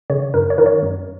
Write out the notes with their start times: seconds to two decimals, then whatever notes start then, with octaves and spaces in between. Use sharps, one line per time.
0.10 C#3 C#5
0.34 F#2 A#4
0.50 C#5
0.58 D#3 A#4
0.66 C#5
0.82 F#2